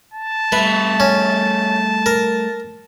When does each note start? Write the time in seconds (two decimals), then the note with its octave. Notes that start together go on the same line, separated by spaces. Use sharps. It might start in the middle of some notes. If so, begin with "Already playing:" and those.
0.14 A5
0.52 G3 A3 B4 E5
1.00 C#4
2.06 A#4